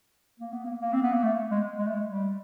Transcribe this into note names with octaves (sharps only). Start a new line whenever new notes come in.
A#3
B3
A#3
A#3
C4
B3
A#3
A3
G#3
G#3
A3
G#3
G3